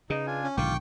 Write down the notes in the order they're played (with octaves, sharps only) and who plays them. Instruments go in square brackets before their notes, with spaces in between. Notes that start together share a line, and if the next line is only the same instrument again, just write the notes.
[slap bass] C#3 [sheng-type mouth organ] D#4 [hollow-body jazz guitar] G#4 B4 D#5
[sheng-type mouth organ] D4 F4 G#5
[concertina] C#4
[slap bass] B1 D3 [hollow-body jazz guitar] G#2 D#3 [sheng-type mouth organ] F4 D6 [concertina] G5 C#6